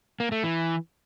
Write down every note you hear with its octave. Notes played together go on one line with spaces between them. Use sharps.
A#3
A3
E3